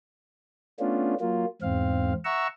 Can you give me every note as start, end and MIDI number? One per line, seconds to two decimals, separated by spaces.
0.80 1.14 57
0.80 1.14 59
0.80 1.14 61
0.80 1.14 62
0.80 1.14 65
1.20 1.45 54
1.20 1.45 58
1.20 1.45 65
1.62 2.13 40
1.62 2.13 44
1.62 2.13 60
1.62 2.13 77
2.25 2.47 76
2.25 2.47 78
2.25 2.47 82
2.25 2.47 85
2.25 2.47 88